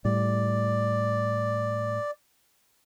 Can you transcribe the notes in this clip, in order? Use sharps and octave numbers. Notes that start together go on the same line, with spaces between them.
A2 G3 D5